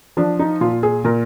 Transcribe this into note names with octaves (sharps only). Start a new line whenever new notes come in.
F3 D4
D#4
A#2 F4
G#4
A#2 A#4